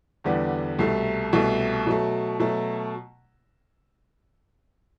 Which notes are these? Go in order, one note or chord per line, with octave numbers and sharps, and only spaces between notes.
E2 D3 G3 B3
C2 B2 A3
C2 B2 A3
B2 F#3 A3
B2 F#3 A3